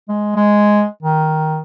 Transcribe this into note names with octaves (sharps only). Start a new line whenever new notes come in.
G#3
G#3
D#3